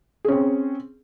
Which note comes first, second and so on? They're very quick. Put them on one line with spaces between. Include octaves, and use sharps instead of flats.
G#4 C#4 C4